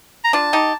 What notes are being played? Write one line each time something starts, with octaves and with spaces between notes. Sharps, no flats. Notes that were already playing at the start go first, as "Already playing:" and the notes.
A#5
D4 F4 A5
D#4 G4